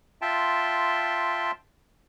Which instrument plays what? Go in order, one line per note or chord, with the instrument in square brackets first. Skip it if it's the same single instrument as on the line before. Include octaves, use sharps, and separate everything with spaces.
[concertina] F4 E5 G5 A5 C6